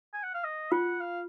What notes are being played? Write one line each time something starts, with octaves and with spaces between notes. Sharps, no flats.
G#5
F#5
F5
D#5
F4 F#5
F5